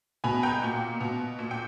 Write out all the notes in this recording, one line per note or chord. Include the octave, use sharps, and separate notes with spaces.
B2 G#5 B5
G5 A#5
A#2
B2
A#2
G5